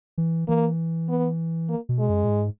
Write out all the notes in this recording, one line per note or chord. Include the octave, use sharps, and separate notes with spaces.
E3
E3 A#3
B3
A#3
B2
G#3
F#2
A#2
G#2